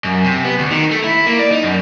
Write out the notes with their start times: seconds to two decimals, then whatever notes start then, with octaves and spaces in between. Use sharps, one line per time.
0.05 F#2
0.24 C3
0.45 B3
0.59 D2
0.71 D#3
0.91 A3
1.04 E4
1.27 A#3
1.39 D5
1.51 D#4
1.63 F#2